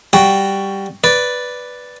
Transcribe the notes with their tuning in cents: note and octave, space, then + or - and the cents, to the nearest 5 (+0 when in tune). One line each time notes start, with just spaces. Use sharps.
G3 +0 F#4 +5 G5 +0
B4 +0 D5 +0